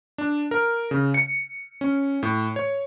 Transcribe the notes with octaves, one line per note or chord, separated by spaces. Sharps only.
D4
A#4
C#3
C#7
C#4
A2
C#5